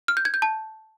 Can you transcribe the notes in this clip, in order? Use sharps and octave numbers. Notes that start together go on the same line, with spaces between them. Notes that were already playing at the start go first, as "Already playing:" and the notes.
F6
G6
G#6
G6
A5